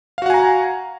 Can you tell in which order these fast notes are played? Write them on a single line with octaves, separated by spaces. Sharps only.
F5 F#4 F#5 G#5 A#5